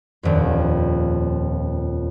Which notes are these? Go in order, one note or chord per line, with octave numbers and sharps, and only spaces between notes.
D#1 F2